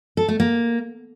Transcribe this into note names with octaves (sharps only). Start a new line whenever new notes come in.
A4
A3
A#3